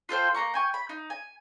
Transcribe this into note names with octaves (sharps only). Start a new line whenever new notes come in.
F4 A4 C5 G5
A#3 B3 A#5 C#6
G5 G#5 C#6
B5
D#4
G#5